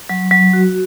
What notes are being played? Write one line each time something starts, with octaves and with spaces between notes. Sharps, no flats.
F#3
F#3
F#4